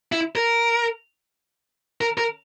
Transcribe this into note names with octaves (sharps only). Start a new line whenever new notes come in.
E4
A#4
A#4
A#4